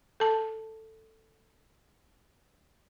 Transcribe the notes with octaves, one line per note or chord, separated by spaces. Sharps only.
A4 A5